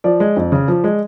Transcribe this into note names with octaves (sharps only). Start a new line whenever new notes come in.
F3 D5
G#3
F2
C#3
F3
G#3